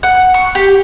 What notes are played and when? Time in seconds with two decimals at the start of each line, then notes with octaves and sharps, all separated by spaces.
0.03 F#5
0.34 C#6
0.55 G4